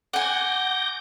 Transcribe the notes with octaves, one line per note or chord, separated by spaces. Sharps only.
F#5 G#5 D6 G6 A#6